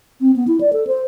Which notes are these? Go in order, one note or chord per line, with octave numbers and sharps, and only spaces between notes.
C4
B3
E4
D5
A4
C5